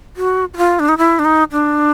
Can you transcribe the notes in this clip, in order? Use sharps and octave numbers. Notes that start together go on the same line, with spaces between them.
F#4
F#4
F4
D4
D#4
E4
D4
D#4
D4